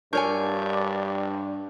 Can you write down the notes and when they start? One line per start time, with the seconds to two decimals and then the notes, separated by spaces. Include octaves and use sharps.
0.13 G2 D4 A#4 C#5 D5 G#5 C#6 G6